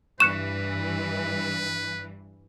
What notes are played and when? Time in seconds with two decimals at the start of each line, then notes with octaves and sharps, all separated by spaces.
0.20 G2 E3 B4 C#6 F#6 C#7 E7